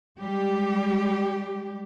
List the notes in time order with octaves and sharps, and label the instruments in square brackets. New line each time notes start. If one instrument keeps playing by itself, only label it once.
[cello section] G3 G#3 G4